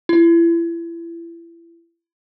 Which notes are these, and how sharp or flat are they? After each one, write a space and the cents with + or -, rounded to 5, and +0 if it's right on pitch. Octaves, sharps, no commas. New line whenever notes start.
E4 +30